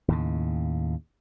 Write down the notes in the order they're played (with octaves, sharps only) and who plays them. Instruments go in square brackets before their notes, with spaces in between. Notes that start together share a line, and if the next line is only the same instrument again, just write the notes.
[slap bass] D#2 A2 C#3